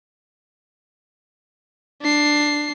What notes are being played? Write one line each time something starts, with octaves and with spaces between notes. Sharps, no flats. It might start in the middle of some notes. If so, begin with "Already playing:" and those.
D4 C7